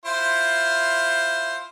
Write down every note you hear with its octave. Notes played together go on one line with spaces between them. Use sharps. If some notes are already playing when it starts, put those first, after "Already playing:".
E4 F4 C5